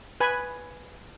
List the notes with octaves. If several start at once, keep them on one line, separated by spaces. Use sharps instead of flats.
B4 G#5 B5